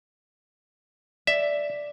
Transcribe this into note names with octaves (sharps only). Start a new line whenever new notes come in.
D5 E5